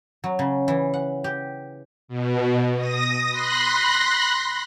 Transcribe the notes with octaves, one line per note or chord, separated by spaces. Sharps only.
F#3
C#3
E3
F#5
G4
B2
D#6 A#6
B5 C6 F#6 A#6